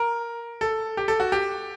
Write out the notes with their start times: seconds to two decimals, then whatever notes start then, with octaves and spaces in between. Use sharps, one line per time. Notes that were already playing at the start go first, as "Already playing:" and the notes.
Already playing: A#4
0.61 A4
0.97 G4
1.08 A4
1.20 F#4
1.32 G4